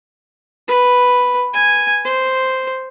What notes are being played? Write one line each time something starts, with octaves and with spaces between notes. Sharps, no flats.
B4
G#5
C5